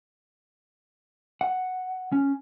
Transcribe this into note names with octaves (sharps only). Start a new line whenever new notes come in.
F#5
C#4